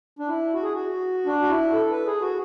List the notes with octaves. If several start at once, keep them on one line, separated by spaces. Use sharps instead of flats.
D4
E4
F#4
G#4
F#4
D4
F#4
E4
A4
B4
G#4
F#4